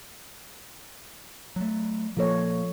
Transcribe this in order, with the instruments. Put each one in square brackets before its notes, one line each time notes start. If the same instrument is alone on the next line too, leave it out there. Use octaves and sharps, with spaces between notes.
[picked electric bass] F#3 A3
[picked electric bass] A#2 A#3 [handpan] F3 A4 C#5